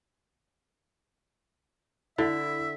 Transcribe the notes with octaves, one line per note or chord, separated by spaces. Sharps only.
D3 E4 E5